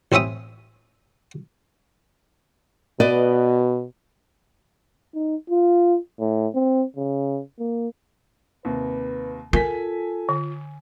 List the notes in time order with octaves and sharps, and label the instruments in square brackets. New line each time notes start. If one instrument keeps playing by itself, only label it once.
[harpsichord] A1 C4 C#4 E5 D#6
[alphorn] B2 [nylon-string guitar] B4 D5 D#5
[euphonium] D#4
F4
A2
C4
C#3
A#3
[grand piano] D#2 C3 [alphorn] B4
[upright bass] F4 [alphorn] A4 [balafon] A#4 [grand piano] G#5 B6
[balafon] D3